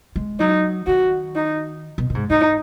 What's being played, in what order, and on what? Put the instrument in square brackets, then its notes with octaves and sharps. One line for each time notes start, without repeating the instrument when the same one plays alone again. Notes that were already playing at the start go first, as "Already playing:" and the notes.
[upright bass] G#3
[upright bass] F#3 [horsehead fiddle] D#4
[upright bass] D#3 [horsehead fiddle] F#4
[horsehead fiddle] D#4
[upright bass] B2
B2
G#2
[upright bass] G#2 [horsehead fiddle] D#4